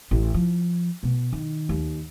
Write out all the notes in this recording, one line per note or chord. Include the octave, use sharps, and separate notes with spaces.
A1
F3
B2
D#3
D#2